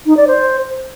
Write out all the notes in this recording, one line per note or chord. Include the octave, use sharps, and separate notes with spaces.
D#4
D5
C5